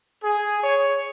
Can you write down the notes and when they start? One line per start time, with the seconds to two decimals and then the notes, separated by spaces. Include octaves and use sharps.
0.24 G#4
0.62 C#5